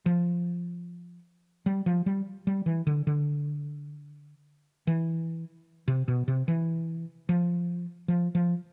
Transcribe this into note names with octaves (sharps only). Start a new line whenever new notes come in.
F3
G3
F3
G3
G3
E3
D3
D3
E3
C3
B2
C3
E3
F3
F3
F3